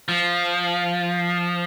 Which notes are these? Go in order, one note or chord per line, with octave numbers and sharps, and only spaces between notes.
F3